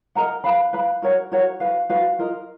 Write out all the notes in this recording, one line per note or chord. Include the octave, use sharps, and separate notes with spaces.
A#4 D#5 F#5 A#5
B4 F5 B5
B4 F5 B5
F#4 A#4 C#5 F#5
F#4 A#4 C#5 F#5
F#4 B4 F5
F#4 B4 F5
F4 A#4 D#5